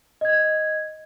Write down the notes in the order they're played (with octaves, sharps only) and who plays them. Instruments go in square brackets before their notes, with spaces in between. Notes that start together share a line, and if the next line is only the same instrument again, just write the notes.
[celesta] D#5 G#6